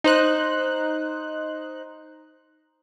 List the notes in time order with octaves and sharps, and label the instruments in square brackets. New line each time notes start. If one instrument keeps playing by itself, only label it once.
[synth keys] D#4 C5 F#6